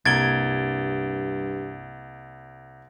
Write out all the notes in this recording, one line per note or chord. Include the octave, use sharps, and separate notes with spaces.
C2 G2 A#3 G#6 A6 D7 G7